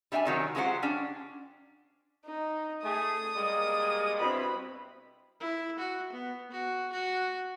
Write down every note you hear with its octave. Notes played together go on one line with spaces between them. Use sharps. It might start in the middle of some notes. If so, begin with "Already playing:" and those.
G3 D4 E5 G5 G#5
C3 D#3 F#3 G3
F#3 G#3 F4 G4 C5 F#5
C#4 D4
D#4
A3 G#4 D#6
G3 G#3 A#3
G2 B2 C4 E4 B5
E4
F#4
B3
F#4
F#4